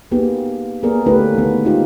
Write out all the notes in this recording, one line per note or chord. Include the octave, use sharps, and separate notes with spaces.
A#3 B3 D#4 G4 G#4
A#3 B3 G#4 A#4 D5
D3 A3 C#4 E4 G4 B4
D#3 B3
G#3 B3 D#4 F4 G4 C5